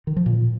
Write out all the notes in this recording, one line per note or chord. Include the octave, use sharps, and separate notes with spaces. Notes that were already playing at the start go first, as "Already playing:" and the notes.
D#3
F3
A#2